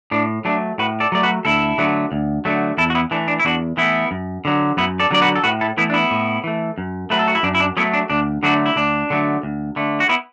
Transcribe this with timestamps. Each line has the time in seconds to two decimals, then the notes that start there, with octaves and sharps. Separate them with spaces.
0.11 A2 D4
0.45 F#3 A3 D4
0.78 A2 F#4 B4
1.00 A4 D5
1.12 F#3 A3 D5
1.23 F#4 B4
1.45 D2 E4 A4
1.78 D3 F#3 A3
2.12 D2
2.45 D3 F#3 A3
2.78 E2 E4 A4
2.90 F#4
2.95 B3 E4
3.11 E3 A3 D4
3.28 D4
3.40 E4
3.45 E2 D4 F#4
3.77 E3 A3 B3 E4
4.11 F#2
4.45 D3 F#3
4.77 F#2 B3 E4
5.00 A4 D5
5.11 D3 F#3 D5
5.22 F#4 B4
5.36 A4
5.43 A2 F#4 B4
5.61 E4 A4
5.77 E3 A3 B3 E4
5.90 D4
5.94 B3 E4
6.11 A2
6.44 E3 A3
6.78 F#2
7.10 F#3 A3 B4
7.19 A4
7.28 F#4
7.35 E4
7.43 F#2 D4
7.55 E4
7.60 D4
7.77 F#3 A3 B3 E4
7.94 D4
8.10 D2 D4
8.43 D3 F#3 A3 D4 F#4
8.66 E4
8.76 D2 D4
9.10 D3 F#3 A3
9.43 D2
9.76 D3 A3
10.00 F#4
10.09 B3 E4